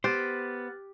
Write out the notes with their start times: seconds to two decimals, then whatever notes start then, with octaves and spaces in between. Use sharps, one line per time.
0.04 B3 G4 C5 F6 F#6 A6